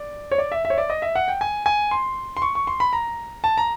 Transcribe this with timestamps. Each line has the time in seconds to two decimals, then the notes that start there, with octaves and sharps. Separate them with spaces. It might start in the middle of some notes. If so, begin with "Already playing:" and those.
Already playing: D5
0.32 C#5
0.38 D5
0.52 E5
0.65 E5
0.70 C#5
0.78 D5
0.90 D#5
1.02 E5
1.15 F#5
1.28 G5
1.41 G#5
1.66 G#5
1.91 C6
2.37 C6
2.42 C#6
2.55 C#6
2.67 C6
2.80 B5
2.93 A#5
3.44 A5
3.58 A#5